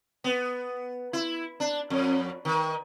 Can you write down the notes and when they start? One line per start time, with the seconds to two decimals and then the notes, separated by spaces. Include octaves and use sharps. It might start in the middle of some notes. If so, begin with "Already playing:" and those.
0.24 B3
1.13 E4
1.60 D4
1.90 F2
2.45 D#3